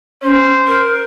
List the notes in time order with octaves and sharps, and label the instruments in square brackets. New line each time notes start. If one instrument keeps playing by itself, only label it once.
[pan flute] C#4 [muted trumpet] C5
[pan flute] A#4